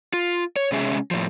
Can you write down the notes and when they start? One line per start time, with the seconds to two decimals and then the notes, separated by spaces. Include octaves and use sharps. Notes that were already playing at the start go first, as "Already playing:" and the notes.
0.13 F4
0.56 C#5
0.72 C3 G#3 C#4 G#4 E5
1.11 A2 F3